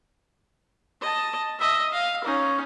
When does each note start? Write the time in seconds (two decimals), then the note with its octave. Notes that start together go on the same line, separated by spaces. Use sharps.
1.01 D#5 A5
1.59 D#5 E5
1.92 F5
2.24 C#4 D#4